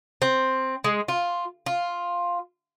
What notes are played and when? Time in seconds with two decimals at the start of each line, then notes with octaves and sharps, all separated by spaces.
0.22 C4
0.84 G#3
1.08 F4
1.66 F4